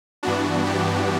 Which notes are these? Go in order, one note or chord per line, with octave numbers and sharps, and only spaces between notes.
G2 E3 B3 D4 F#4
G4